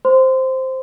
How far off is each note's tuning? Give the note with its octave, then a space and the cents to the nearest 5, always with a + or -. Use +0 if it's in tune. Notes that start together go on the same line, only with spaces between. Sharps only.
C5 +0 C6 -25